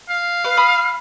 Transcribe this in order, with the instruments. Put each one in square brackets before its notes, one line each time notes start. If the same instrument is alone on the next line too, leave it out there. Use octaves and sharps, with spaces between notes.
[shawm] F5
[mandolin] B4
B5 D#6